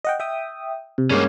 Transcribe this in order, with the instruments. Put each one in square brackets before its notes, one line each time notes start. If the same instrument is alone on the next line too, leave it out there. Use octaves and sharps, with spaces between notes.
[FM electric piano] D#5 F#5 G5
E5 G5 D#6
C3
[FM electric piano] G2 G#3 [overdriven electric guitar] A#3 C#4